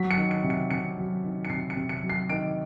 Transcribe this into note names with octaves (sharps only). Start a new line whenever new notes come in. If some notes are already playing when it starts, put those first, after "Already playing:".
Already playing: F#3 B6
C#7
D#3
C#7
C3
C#7
C3 C#7
F#3
D#3
C#7
C3 C7
C#7
C3
C#7
F#3
C7
D#3 D7